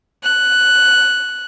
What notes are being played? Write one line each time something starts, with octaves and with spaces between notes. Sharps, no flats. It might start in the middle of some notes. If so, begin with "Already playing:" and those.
F#6